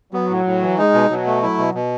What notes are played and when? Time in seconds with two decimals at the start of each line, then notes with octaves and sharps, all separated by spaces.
0.13 F#3 B3
0.30 A2
0.46 A2
0.62 E3
0.78 G#3 D#4
0.94 B2
1.10 B2 F#3
1.26 A3
1.42 F#3 E4
1.58 B2
1.75 B2